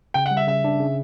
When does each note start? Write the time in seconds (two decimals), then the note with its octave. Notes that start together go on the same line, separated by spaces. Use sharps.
0.14 C#3 G5
0.26 F#5
0.31 G3
0.37 E5
0.47 C#3 E5
0.64 D4
0.80 C#3